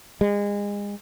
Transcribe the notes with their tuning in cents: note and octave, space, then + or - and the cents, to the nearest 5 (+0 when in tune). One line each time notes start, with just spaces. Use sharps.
G#3 -30